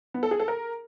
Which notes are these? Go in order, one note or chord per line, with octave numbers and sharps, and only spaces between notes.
B3
A4
G#4
A4
A#4